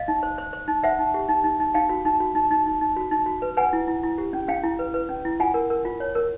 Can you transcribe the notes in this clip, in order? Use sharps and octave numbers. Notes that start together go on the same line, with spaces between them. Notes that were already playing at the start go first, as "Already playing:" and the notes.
Already playing: D#5 F5
D#4
C5
C5
C5
D#4
C5 E5 F#5
D#4
G4
D#4
D#4
D#4
D#4 F5 G5
F#4
D#4
F#4
D#4
D#4
D#4
D#4
F#4
D#4
F#4
B4
B4 F#5 G#5
E4
E4
E4
G4
C#4
C#4 F5 G5
E4
B4
B4
C#4
E4
F4 F#5 G#5
A#4
A#4
F4
C#5
A#4